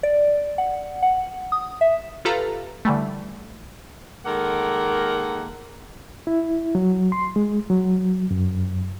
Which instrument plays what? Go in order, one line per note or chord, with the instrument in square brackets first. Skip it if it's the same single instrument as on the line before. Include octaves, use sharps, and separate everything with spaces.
[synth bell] D5
F#5
F#5
D#6
E5
[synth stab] F4 G4 A4 B4 F5 A#5
D3 E3 G3 A3
[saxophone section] D#3 G#3 A#3 A4 A#4 F#5
[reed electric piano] E4
F#3
C6
G#3
F#3
F#2